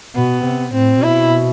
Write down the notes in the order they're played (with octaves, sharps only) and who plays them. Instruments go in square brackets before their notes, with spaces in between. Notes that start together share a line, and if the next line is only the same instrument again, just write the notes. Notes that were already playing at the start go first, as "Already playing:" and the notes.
[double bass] B2 [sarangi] B3
[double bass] C3
[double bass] A2 [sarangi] C4
[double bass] B2 [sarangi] E4